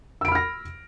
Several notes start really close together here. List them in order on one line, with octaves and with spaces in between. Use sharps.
E6 D7 B5 F6 A#6